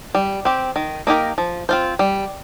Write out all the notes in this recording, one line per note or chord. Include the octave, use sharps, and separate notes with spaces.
G3
C4 G4
D#3
A#3 D#4 G4 A#4
F3
C4 F4 C5
G3